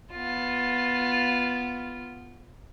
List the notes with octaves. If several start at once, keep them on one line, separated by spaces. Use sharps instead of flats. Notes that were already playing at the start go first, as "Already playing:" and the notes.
B3 F4